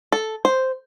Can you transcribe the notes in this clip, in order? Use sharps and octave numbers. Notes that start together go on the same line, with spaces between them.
A4
C5